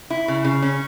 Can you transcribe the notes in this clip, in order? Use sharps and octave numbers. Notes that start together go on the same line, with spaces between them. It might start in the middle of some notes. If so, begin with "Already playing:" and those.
E4
C#3
C#3
C#4